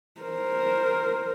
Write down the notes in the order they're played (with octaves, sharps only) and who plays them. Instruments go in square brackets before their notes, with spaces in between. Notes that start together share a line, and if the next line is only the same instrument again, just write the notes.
[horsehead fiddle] A#4 C5